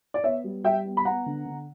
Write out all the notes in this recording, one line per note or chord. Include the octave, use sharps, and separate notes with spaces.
D5
B3 C#5 E5
G3
G3 E5 G5
B3
B5
B3 F#5 A#5
D3
D3